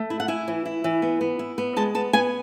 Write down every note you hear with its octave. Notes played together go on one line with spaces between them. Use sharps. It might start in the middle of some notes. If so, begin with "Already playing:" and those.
Already playing: A3
E4
F#5
E4 G#5
E3
E4
E3
B3
B3
E4
B3
G#3 A5
B3 A5
B3 G#5